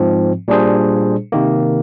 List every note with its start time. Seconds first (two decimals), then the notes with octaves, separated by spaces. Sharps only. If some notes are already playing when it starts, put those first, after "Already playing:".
Already playing: G#2 F3 C4
0.48 A#2 G3 D4 G#4 C5
1.32 C3 D#3 A#3